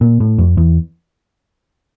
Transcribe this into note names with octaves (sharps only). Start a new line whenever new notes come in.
A#2
A2
F2
E2